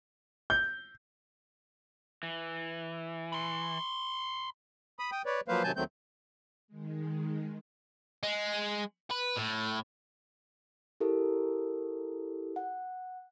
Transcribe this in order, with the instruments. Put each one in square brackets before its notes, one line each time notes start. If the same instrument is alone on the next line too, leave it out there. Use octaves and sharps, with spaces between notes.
[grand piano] G6
[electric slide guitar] E3
[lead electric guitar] B5 C6
[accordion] B5 D#6
G5 D#6
B4 C#5 D5
F3 F#3 A#3 B4 C5 F5
C3 D#3 F#3 G#5 A5 G6
D#2 D#3 F#3 A3 C4 G6
[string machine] D#3 G#3
[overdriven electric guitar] G#3
B4
A2
[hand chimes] E4 G4 A4 A#4
F#5